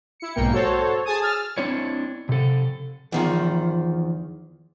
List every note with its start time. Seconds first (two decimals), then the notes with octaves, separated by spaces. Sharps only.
0.20 E4 C#7
0.35 B1 G#2 A#3 G5 C#7
0.53 F#4 A4 C5 C#5
1.05 G#4 G#5 A5 D#6
1.22 E6 F6 A6
1.58 C4 D4 E4 C#5
2.29 C3 A4
3.12 E2 D#3 F3